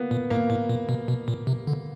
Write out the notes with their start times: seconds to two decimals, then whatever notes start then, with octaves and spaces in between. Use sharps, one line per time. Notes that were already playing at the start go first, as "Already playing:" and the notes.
Already playing: A#3 B3
0.11 A#2
0.30 A2 A#3
0.50 A2
0.69 A#2
0.89 B2
1.08 B2
1.28 A#2
1.47 C3
1.67 D3